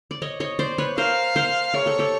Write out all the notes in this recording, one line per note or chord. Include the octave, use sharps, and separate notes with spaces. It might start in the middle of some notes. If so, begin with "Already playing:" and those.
D5
C#5 D#5
C#5 D#5
C5 D5
B4 C#5
A#4 C5 F5
A#4 C5
G#4 A#4 C#5
G4 A4
G4 A4